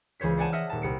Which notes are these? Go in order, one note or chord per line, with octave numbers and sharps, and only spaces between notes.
C#2 E3 C5 C#5 B6
C5 D5 F#5 G#5 A5
D#5 E5 F#5 E6 F6
D#1 A5
C2 C#7 D7